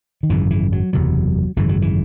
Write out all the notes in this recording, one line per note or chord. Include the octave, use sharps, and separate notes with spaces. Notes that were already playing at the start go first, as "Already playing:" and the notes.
D#3
G#1 F#2 C#3 E3
E3
F#3
F#1 E2 C3 F#3
G#1 F#2 C#3 E3
F#3
E3